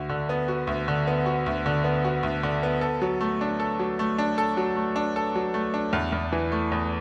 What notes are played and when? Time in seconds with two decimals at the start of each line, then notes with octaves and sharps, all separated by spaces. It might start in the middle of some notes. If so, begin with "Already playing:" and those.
Already playing: D2 F#4
0.09 D3
0.29 B3
0.48 F#4
0.67 D2
0.88 D3
1.07 B3
1.26 F#4
1.46 D2
1.66 D3
1.84 B3
2.04 F#4
2.23 D2
2.43 D3
2.63 B3
2.81 A4
3.02 F#3
3.21 A3
3.41 D4
3.60 A4
3.79 F#3
3.99 A3
4.18 D4
4.38 A4
4.57 F#3
4.76 A3
4.96 D4
5.16 A4
5.35 F#3
5.54 A3
5.74 D4
5.93 E2
6.12 E2
6.32 E3
6.52 A3
6.72 E2